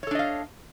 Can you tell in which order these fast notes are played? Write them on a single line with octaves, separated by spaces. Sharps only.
C#5 A4 D4 D#5 F5